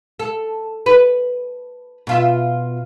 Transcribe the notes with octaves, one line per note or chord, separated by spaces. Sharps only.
A4
B4
B2 F4 E5